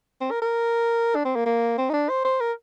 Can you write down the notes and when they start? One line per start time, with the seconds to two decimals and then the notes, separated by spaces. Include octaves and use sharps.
0.21 C4
0.31 A#4
0.42 A#4
1.15 D4
1.25 C4
1.36 A#3
1.46 A#3
1.78 C4
1.90 D#4
1.93 D4
2.09 C5
2.25 C5
2.40 A#4